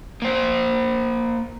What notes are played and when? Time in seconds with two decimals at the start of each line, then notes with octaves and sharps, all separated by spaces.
0.22 A#3 C5